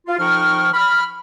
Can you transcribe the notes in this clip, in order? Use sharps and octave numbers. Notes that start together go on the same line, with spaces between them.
F4
F2 F3 D#4 G5 C#6 F6
B5 F6